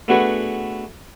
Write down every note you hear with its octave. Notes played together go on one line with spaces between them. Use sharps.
A3 B3 D4 F#4 G#4 B4